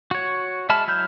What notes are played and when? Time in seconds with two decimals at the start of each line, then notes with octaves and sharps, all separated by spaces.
0.11 F#4 C#5
0.69 G#3 E5 A5 B5 F6
0.88 F#3 E4 F6 G6